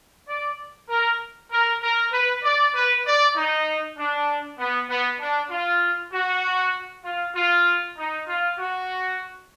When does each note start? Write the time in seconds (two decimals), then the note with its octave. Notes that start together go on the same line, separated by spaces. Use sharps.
0.29 D5
0.90 A#4
1.52 A#4
1.82 A#4
2.12 B4
2.43 D5
2.75 B4
3.06 D5
3.36 D#4
3.98 D4
4.59 B3
4.89 B3
5.20 D4
5.51 F4
6.13 F#4
7.04 F4
7.35 F4
7.97 D#4
8.27 F4
8.58 F#4